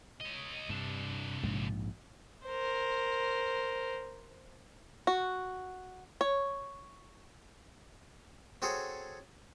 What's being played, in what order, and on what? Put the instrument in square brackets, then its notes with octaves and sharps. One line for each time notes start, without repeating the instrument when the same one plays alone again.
[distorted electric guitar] C#5 D#5
[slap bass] G2 [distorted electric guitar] C3 D4
[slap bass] A#1 G#2 G#3
[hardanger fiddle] A#4 C5
[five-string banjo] F#4
C#5
[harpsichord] C4 F#4 G#4 A4 C#5